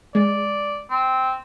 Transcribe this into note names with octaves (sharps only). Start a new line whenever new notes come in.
G#3 D5
C4